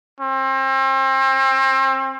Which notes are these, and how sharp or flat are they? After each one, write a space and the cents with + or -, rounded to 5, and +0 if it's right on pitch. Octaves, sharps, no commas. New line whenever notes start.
C4 +35